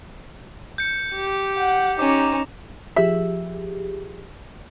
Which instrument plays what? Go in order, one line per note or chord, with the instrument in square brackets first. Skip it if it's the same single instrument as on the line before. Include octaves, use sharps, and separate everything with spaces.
[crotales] G6 C#7
[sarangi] G4
[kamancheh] F#5
[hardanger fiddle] C#4 [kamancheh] D#4 A#5 [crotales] D6
[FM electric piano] F3 G4 G#4 [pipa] E5